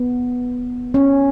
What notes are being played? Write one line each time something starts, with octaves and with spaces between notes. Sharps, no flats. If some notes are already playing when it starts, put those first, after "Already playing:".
Already playing: B3
C#4